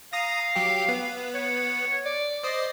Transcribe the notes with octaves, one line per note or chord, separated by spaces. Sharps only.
F5 A#5 D#6 A#6
F#3 G4
B3
C#5
D5
C5 D5 D#5